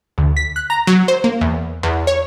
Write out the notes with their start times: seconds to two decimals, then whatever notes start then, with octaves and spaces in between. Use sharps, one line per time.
0.18 D2
0.37 B6
0.56 F#6
0.70 A#5
0.87 F#3
1.08 C5
1.24 A#3
1.41 E2
1.83 E2
2.07 C#5